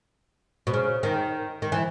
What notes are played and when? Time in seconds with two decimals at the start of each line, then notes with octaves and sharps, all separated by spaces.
0.67 B2
0.74 C#3
1.03 D#3
1.62 D#3
1.72 E3